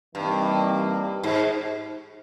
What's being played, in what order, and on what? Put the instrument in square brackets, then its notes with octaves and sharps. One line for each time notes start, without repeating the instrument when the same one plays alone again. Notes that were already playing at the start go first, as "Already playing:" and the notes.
[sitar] G2 [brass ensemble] C3 E3 G3 A#3 D#4
[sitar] G#2